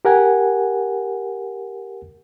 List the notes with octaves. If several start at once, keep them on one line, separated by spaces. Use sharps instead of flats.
G4 A#4 F#5 G#5